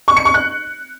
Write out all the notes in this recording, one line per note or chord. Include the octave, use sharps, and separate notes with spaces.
C#6
C#7
C#6
F#6